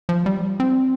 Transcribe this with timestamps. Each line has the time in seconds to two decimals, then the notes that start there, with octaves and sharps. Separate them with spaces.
0.09 F3
0.26 G3
0.60 C4